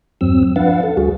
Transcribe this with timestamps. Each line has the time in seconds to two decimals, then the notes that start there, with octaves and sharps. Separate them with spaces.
0.21 E2 G2 F#3 C4 E6
0.56 F3 D4 B4 F5 F#5 A6
0.83 A4
0.97 D2 G3 F#4 G#4